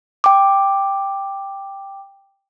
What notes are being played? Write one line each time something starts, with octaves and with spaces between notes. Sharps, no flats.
G5 D6